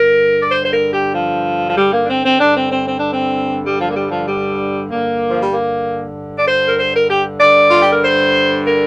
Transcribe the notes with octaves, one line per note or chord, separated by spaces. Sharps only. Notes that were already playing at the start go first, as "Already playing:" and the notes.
Already playing: G2 D3 A#4
D5
C5
C5
A#4
G4
F3
F3
G3
A#3
D4
C4
C4
G2 D3 D4
C4
C4
C4
D4
C4
G3
F3
A#3
G3
F3
G3
G2 D3 A#3
F3
G3
A#3
D5
C5
A#4
C5
A#4
G4
G2 D3 D5
F4
G4
A#4
C5
A#4